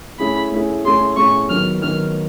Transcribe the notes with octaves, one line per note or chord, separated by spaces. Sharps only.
A3 C#4 E4 G#4 B5
A3 C#4 E4 G#4
A3 C#4 E4 G#4 C6
A3 C#4 E4 G#4 C#6
D#3 F#3 B3 F6
D#3 F#3 B3 F6